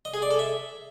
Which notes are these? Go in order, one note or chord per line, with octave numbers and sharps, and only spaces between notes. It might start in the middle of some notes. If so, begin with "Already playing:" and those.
D#5
G#4
D5
A4
E5